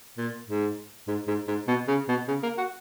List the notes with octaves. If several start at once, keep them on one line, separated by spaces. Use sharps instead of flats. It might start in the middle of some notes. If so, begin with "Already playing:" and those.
A#2
G#2
G#2
G#2
G#2
B2
C#3
B2
C#3
A#3
F#4